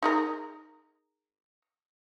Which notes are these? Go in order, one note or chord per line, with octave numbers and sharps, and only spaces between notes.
D#4 G#4 A#4